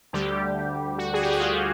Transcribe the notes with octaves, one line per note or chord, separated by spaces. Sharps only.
D2 D3 G3 G4
F#4
G#4
G4
F#4
F4